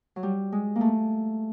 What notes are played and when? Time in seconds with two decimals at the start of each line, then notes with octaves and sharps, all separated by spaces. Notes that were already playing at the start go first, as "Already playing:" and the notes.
0.16 F#3
0.23 G3
0.52 G#3
0.76 A#3
0.81 A3